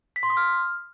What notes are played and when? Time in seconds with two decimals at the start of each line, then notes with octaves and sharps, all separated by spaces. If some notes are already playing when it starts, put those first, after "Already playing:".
0.16 B6
0.23 C6
0.30 D#6
0.37 F6